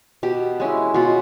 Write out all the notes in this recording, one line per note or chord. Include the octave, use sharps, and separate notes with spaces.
B2 G4
G#3 C#4 E4
B2 F4